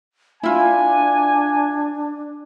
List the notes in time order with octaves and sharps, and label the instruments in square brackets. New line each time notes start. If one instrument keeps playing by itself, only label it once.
[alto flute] D4 [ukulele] E4 F4 [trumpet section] G#5